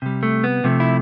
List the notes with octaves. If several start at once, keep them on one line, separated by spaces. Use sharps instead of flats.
C3 G3
A3
B3
C3 F3 A3
E4